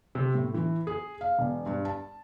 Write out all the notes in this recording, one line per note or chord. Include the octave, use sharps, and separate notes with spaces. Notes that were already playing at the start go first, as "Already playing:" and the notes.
C3
A2
E3
G#4
F5
E1
G2
A5